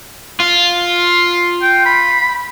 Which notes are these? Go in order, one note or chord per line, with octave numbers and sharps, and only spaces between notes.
F4
G5
B5